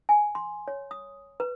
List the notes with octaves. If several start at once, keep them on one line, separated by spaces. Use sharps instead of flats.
G#5
C6
C#5
D#6
B4